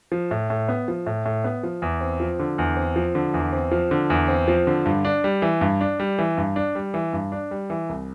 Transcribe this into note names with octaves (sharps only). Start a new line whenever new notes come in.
F3
A2
A2
B3
F3
A2
A2
B3
F3
E2
C4
F3
D3
E2
C4
F3
D3
E2
C4
F3
D3
E2
C4
F3
D3
G2
D4
G3
E3
G2
D4
G3
E3
G2
D4
G3
E3
G2
D4
G3
E3
C2